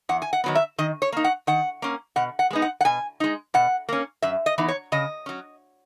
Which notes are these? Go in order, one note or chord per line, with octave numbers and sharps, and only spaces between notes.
E2 F#5
G#5
F#5
D#3 F#3 B3
E5
D#3 D#5
C#5
A#3 D#4
F#5
D#3 F#5
A#3 C#4
B2 F#5
F#5
G#3 B3 D#4
F#5
F#5
B2 G#5
G#3 D#4
B2 F#5
A#3 C#4
F#2 E5
D#5
E3 B3 D#4
C#5
C#3 D#5
F#3 C#4